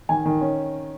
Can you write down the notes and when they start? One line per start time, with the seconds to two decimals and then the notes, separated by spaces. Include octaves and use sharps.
0.09 D#3 G#5
0.25 D#3
0.41 C#4